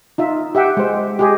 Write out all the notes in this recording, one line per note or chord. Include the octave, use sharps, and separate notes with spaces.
D#4 F4 E5
G4 E5 F#5 G5
G#3 C5
G4 G#4 D#5